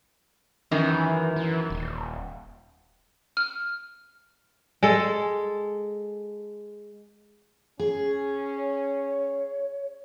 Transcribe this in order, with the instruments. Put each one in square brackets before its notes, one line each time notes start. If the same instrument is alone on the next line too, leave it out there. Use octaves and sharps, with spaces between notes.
[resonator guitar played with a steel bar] F#2 D#3 [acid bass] E3
[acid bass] E3
D#1
[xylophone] F6
[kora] G#3 A4
[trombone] C#4 [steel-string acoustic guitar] G#4
[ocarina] C#5